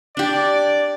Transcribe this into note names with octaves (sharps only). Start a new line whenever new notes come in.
D4 G4 D5